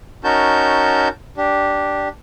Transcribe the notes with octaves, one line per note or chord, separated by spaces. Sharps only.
C#4 D#4 F#4 A#4 A5 G6
D4 G4